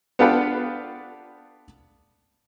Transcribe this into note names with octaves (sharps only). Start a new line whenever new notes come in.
B3 D4 F4 G4 A4 B4